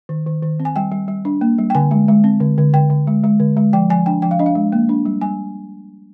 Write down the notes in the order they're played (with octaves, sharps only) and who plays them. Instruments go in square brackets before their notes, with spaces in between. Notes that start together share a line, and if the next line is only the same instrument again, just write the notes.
[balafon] D#3
D#3
D#3
C4
G#5
G3 G5
G3
G3
D4
A#3
G3
G5
D3 G#5
G#3
G#3
C4
D3
D3
D3 G5
D3
G#3
G#3
D3
G#3
F3 G5
F3 G#5
D4 G5
F3 G5
F5
D4 D#5
F5
G#3
A#3
D4
G3
G3 G#5